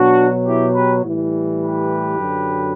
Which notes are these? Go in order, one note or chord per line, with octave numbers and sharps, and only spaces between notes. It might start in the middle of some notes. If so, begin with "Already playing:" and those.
Already playing: B2 F#3 D4 F#4
E4 G4
G4 B4
A2 E3 G3
G4 B4
F#2 D3 F#3